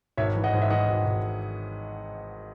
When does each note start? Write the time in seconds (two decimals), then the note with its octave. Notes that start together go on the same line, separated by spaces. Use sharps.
0.17 G#1 C#5 E5
0.35 E3
0.44 D#5 F#5
0.53 G#2
0.62 E5
0.70 E3 D#5 F#5
0.88 G#1
1.06 G#1